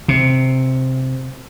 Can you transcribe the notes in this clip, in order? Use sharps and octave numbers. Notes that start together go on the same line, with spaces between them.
C3